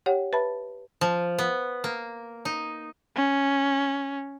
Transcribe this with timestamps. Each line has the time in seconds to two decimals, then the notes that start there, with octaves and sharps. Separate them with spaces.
0.06 G4 C#5 F#5 G5
0.33 B4 E5 A5 B5
1.01 F3
1.39 B3
1.84 A#3
2.45 D#4
3.16 C#4